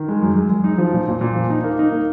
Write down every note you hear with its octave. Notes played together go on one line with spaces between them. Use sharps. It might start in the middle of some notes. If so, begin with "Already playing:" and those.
Already playing: D#3
G#3
F#2
G#3
F#2
D#4
F3
A#2
A#2
A#2
F3
D#4
A#3
D#4
A#3